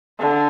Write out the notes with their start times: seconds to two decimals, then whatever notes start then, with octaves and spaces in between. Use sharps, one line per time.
0.19 D3